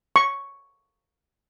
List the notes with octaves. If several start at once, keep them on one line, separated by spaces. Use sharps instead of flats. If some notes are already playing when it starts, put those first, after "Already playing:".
C#6